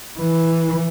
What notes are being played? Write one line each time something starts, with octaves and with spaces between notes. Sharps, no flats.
E3